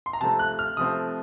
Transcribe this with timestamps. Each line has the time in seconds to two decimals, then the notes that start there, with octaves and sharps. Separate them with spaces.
0.06 C6
0.13 A#5
0.21 C3 F3 A3 C4 A5
0.39 F#6
0.59 F6
0.77 C3 F3 A3 C4 D#6